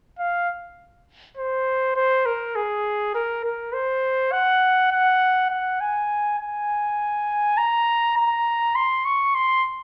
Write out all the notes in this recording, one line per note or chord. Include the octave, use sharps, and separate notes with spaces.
F5
C5
C5
A#4
G#4
A#4
A#4
C5
F#5
F#5
F#5
G#5
G#5
A#5
A#5
C6
C#6
C6